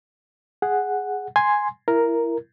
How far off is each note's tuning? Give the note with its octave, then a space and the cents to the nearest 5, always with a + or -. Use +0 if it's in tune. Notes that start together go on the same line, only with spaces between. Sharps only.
G#4 +0 F#5 +0
G#5 +0 C6 +0
E4 +20 A#4 +0